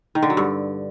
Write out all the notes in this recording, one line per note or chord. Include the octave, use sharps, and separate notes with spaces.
D#3
D3
F#3
G2